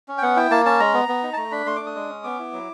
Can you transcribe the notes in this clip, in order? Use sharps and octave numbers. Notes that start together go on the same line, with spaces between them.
C#4
G5
B3 F#5
E4 G5
A#3 A5
C#4 A5
G#3 A#5
B3
B3
D#4
A5
A3 A#5
D4 B5
A3 C6
D4 D6
D#6
G#3
C#4
B3 D6
E4
F#3